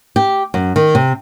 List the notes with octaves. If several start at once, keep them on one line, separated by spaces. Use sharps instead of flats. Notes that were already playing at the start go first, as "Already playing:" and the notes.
G4
F#2
D#3
C3